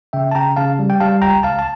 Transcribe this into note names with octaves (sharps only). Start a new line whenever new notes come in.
C#3 E5 G5
A5
C#3 G5 A#5
C#3 F5 A5
G3
G5
G3 F5 A5
C#2 G5 A#5
C#2 F5 A5
A5